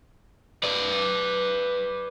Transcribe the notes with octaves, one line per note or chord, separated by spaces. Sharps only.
B4 D5